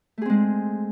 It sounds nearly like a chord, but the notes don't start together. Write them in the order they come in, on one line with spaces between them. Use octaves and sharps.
A3 G#4 C4 G#3